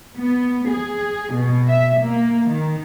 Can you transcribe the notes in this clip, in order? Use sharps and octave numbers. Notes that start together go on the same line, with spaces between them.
B3
G#4
B2
E5
A#3
D#3